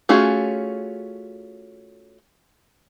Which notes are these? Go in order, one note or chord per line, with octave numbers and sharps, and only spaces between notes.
A3 C#4 F4 F#4 G#4